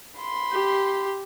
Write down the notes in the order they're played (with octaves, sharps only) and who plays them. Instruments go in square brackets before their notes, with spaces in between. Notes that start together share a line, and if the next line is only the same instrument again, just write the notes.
[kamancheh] B5 C6
[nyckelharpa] G4